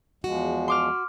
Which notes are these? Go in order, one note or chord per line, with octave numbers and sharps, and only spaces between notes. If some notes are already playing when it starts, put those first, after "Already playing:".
E2 F3 G#3 F#4
C6 D6 F6